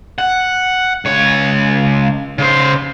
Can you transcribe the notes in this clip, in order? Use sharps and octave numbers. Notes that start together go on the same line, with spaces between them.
F#5
C#2 C#5
C#3 C5